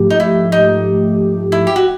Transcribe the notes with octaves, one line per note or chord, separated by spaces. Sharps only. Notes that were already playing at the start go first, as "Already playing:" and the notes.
Already playing: G#2 F3 A3 G4
D#4
E4
D#4
E4
G4
F#4